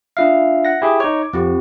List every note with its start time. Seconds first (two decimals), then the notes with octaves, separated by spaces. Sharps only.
0.17 D4 F4 E5 F5
0.65 F#5 A#6
0.82 E4 G4 G#4
1.00 D#4 C#5 D6
1.33 F2 C4 F4 G4